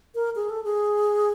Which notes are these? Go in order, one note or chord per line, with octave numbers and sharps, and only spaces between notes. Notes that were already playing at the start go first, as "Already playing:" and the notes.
A#4
G#4
A4
G#4